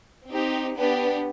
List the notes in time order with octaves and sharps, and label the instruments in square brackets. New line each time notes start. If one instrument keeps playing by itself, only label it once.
[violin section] C4 D#4 G4
B3 D4 G4 B4